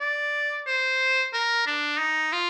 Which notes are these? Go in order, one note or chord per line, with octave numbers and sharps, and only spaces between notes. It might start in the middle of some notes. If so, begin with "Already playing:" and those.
D5
C5
A#4
D4
D#4
F4